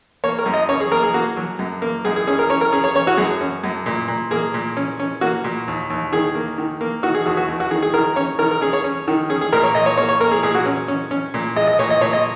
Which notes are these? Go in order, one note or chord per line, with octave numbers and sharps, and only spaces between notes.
A#3 C#5
A#4
F#2
D#5
C#4 C#5
G#4
A#3 A#4
G#4
A#3 F#4
F#3
F#2
A#3
F#2 G#4
G#4
C#4 G#4
A#4
C#4 C#5
A#4
C#4 G#4
C#5
C#4 C#5
F#4
F#2 G#4
C#4
F#2
A#2
A#2
A#3 G#4
A#2
C#4
C#4
A#3 F#4
A#2
D#2
D#2
D#3 G#4
A#3
D#3
A#3
D#3 F#4
G#4
D#2 F#4
F#4
D#2
F#4
D#3 G#4
G#4
D#3 A#4
C#4 C#5
D#3 A#4
A#4
C#4 G#4
C#5
C#4
D#3
C#4 G#4
G#4
A#2 A#4
C#5
A#2 D#5
C#5
A#3 C#5
C#5
A#3 A#4
G#4
A#2 G#4
F#4
C#4
C#4
C#4
A#2
G#3 D#5
D#5
A#2 C#5
D#5
A#2 C#5
D#5